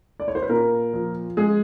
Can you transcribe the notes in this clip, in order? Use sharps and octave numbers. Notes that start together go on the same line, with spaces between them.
D5
C#5
C5
B4
A#2 A#4
F3
G#3 G#4